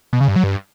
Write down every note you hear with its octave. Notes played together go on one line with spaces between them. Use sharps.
B2
C#3
G2
F#3
G2